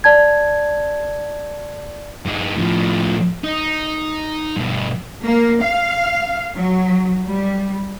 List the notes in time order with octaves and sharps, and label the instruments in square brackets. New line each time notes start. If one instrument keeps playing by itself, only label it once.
[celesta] D5 A5 G#6
[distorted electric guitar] G2 D#4
A2 F3
D#4
G2 B2
[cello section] A#3
F5
F#3
G3